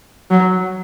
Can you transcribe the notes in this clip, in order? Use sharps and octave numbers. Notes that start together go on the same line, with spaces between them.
F#3